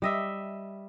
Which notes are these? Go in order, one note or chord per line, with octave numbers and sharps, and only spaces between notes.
G3 D#5 E5